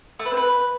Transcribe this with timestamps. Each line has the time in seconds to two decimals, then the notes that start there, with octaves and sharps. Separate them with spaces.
0.19 A3
0.25 B4
0.31 C4
0.37 B4